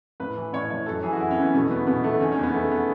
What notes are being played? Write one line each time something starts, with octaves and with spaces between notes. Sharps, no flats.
A2 B4
E3
A2 C#5
A2 C#5
F#2 A4
E3 G#4
F#4
F#2 E4
C#4
E3
B3
B2 A3
E2 B3
B2 B3
B2 A3
D#3 C#4
C#4
E2
B3
E2 A3
B3